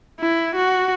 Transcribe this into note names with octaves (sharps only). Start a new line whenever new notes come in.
E4
F#4